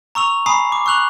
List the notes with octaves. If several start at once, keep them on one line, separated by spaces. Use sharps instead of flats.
A#5 C#6 E6 F7
G#5 A#5 B5 D#6 C7
D6
C#6 E6 F#6 F7 F#7